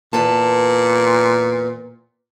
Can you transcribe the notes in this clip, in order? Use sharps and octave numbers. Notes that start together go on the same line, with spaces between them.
E2 A#2 B4 A5